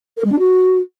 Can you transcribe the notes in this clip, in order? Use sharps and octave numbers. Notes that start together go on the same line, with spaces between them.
A#4
G#3
D4
F#4